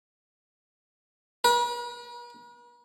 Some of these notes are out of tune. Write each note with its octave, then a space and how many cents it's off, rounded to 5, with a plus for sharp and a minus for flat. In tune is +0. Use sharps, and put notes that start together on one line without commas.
B4 -45